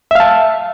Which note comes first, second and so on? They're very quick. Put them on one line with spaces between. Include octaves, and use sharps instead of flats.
E5 F5 A5